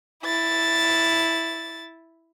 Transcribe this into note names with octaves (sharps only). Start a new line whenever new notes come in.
E4 A6